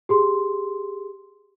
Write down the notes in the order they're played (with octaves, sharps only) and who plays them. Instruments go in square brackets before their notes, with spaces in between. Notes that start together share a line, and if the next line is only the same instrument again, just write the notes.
[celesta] G4 G#4 C6